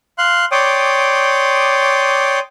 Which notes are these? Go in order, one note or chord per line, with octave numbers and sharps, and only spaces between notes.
F5 C6 F#6
C#5 D5 G5 C6 D6 D#6